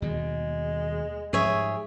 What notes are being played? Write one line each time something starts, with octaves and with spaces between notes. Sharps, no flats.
D#2 B2 G3 G#3
G#2 F3 G3 G#4 C#5 E5